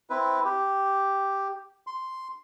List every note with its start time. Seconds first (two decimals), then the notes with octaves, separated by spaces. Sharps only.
0.10 C4 E4 B4
0.45 G4
1.87 C6